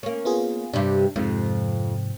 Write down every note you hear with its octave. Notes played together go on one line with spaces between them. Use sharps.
A#3 C#4
B3 F4 G#4
G2 C3 D4
F2 G#2 C3 F3